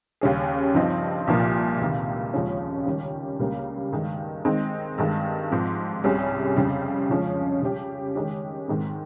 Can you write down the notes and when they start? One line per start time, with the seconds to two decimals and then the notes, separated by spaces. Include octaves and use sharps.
0.21 D#2 C#3 G3 C#4 G#4
0.74 G2 F3 C4 D#4
1.27 C2 A#2 F3 A#3 F4
1.81 C#2 C3 D#3
2.34 D#2 C#3 F3 G#3 C#4
2.86 D#3 G3 C#4 G4
3.39 C#2 C#3 G3 A#3
3.92 G2 D#3 G#3
4.45 D#3 G#3 C4 D#4
4.98 G2 D#3 G#3
5.51 G#2 F3 C4
6.04 C2 C3 G3 C#4 G#4
6.56 F2 C#3 G3 C4
7.09 C#3 F3 G#3 C#4
7.62 C#3 G3 C#4 G4
8.15 D#3 G#3 C#4 G4
8.68 G#2 D#3 G#3 C4